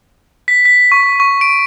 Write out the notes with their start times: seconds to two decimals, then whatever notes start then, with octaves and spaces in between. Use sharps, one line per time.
0.48 B6
0.65 B6
0.92 C#6
1.20 C#6
1.41 D7